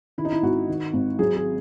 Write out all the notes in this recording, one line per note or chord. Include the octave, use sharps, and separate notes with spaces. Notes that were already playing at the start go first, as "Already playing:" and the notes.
D#3 E4
D#4
E4
G#1 F#4
D#3
G#1
F#3 G#4
G#4